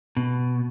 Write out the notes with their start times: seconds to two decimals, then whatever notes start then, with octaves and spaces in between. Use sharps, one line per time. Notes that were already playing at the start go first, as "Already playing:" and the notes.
0.17 B2